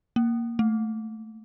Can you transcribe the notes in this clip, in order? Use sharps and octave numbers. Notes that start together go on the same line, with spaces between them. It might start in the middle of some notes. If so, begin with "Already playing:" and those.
A#3
A3